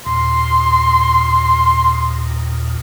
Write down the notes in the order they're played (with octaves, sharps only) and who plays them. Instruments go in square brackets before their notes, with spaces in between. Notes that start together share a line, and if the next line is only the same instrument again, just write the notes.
[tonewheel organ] D#2 A#2 [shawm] C6